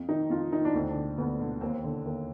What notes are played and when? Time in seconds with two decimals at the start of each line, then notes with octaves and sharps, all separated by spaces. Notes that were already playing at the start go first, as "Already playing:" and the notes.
Already playing: F2
0.09 D#3 D#4
0.30 F2 F4
0.52 D#3 D#4
0.65 D4
0.74 D2 C4
0.89 D4
0.96 D3
1.18 D2 B3
1.40 D3
1.61 D#2 C4
1.84 D3
2.06 D#2